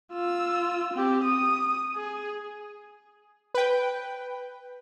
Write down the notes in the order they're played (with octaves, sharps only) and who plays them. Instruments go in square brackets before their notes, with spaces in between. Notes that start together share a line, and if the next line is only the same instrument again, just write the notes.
[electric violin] F4 E6
C4 G4
D#6
G#4
[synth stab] B4 G5